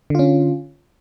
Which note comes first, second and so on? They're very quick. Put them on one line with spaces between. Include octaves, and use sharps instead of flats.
D3 F4 C#4